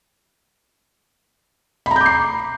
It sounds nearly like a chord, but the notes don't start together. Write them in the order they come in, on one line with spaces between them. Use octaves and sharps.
B5 A#5 G6 D6 C7